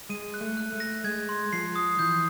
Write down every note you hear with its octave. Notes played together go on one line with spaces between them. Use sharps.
G#3 D#7
F#6
A3
F#6
A3
A#6
G#3 G#6
C6
F3 C7
D#6
E3 G6